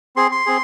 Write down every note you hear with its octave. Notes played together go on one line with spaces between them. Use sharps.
C4 G#4 C6
C6
C4 G#4